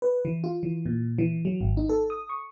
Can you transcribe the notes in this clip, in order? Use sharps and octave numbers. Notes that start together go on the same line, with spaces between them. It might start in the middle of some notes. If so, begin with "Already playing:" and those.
B4
E3
F4
E3
A#2
E3
F#3
G#1
D#4
A4
D#6
C#6